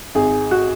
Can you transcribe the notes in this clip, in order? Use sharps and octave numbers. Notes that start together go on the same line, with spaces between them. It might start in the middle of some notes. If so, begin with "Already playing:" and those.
G#1 G#4
F#4